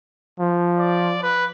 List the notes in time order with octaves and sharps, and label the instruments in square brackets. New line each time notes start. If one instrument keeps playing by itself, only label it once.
[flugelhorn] F3
[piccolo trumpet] D5
B4